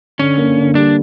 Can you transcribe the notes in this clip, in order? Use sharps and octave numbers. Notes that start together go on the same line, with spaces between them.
D3 C#4
A#3
D3
G3 D4